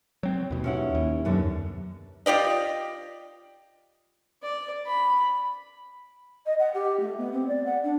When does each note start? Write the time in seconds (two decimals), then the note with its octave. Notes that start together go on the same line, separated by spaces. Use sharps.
0.23 F#3 C4
0.50 D#2 B2
0.64 C#4 E4 F#5
0.95 D#2
1.25 F#2 B2 D3
2.26 F4 G4 D5 D#5
4.43 D5
4.86 B5
6.46 D#5
6.59 F#5
6.74 G4
7.00 A3
7.17 B3
7.32 C4
7.48 D5
7.65 F#5
7.83 D4